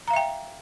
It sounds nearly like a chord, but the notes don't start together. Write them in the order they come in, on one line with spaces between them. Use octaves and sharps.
A#5 F5 E5 G5